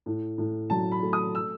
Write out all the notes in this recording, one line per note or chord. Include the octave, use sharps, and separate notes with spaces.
A2
A2
F#3 A5
B5
A3
D#6
E6